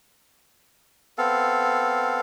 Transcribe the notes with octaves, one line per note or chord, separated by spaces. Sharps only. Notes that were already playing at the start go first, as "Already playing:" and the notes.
B3 C4 A4 F5